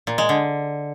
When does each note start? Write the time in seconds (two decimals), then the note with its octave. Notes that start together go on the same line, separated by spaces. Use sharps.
0.07 A#2
0.18 G#3
0.29 D3